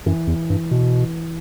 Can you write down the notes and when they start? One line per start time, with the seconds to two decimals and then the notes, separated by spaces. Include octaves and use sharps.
0.06 F#2 E3
0.27 E2
0.50 G2
0.71 B2